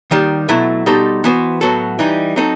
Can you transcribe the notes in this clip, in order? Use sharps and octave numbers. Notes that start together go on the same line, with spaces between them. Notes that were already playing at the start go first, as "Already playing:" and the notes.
D#2 D#3 G3
B2 F#3 A3 E4
B2 G3 D#4 A4 C5
E3 B3 F#4 C5
A2 F#3 B3 F#4 A4
E3 G3 D#4
F#3 C4 D#4 A4